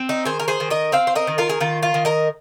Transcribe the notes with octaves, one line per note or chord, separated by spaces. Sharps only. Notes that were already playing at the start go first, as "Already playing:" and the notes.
Already playing: C4
D#4
D#3 G#4 C5
A#4
G#4 C5
D#3
A#4 D#5
C4 C5 F5
C5
A#4 D#5
D#3
F4 A#4
G#4
D#3 F4
F4
D#3
A#4 D#5